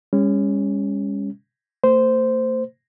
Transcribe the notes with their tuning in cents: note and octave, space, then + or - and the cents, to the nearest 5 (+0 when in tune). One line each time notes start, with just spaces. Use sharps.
G#3 -45 C#4 +0
A3 +45 C5 -10